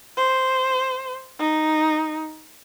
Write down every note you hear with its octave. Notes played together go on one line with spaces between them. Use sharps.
C5
D#4